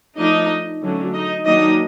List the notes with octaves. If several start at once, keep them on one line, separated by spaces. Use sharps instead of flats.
F3 A3 D4 D#4 D#5
D3 F#3 A3 C#4
D#4 D#5
D#3 F#3 A#3 D4 D#4 D#5